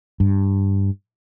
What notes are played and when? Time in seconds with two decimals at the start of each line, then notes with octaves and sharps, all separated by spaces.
0.20 G2